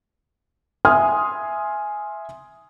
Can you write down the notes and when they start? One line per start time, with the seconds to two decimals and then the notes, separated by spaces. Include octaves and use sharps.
0.85 E5 G#5 C6 D#6 F6